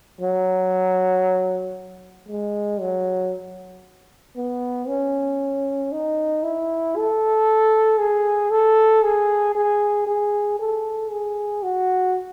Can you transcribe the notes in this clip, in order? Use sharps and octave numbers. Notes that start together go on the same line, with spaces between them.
F#3
G#3
F#3
B3
C#4
D#4
E4
A4
G#4
A4
G#4
G#4
G#4
A4
G#4
F#4